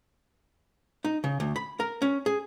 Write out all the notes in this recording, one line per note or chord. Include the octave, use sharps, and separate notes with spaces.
D#4
C#3
D2
B5
A#4
C#4
G#4